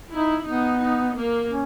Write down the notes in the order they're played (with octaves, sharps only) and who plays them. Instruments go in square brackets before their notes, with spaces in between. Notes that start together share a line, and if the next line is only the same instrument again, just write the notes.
[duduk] D#4 [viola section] E4
[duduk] B3 [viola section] D#4
[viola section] D#4
A#3
[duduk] C#4